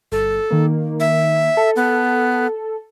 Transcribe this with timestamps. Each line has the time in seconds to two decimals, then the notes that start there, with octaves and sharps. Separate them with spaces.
0.12 G1 A4
0.51 D#3 A#3
1.00 E5
1.57 A4
1.76 B3